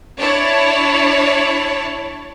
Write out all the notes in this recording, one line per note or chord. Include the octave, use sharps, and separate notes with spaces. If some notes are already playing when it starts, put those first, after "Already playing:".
D4 E4 C#5 A5